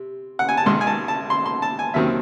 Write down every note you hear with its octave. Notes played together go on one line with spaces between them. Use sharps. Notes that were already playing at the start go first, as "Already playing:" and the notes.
Already playing: C3
F#5
G#5
A5
G#1 G#2 D#3 C6
G#5
A5
A5
C6
C6
A5
G#5
D#2 D#3 F#3 C4 E5